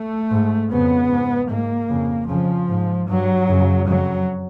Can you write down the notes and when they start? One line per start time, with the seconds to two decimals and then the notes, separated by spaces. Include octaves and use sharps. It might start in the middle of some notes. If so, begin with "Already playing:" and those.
Already playing: A3
0.31 G#2
0.70 F2 C#3 B3
1.10 G#2
1.49 G#2 A#3
1.88 F2 C#3
2.28 F2 C#3 F3
2.68 G#2
3.07 G2 F#3
3.47 F#2 C#3
3.87 F2 C#3 F#3